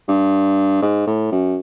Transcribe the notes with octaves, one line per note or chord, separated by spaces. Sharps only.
G2
G#2
A2
F#2